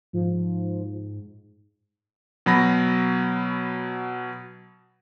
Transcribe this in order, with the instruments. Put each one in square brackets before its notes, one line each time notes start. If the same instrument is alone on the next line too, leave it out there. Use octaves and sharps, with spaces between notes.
[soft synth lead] G#2 [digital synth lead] F3
[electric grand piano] B2 F#3 B5 A#6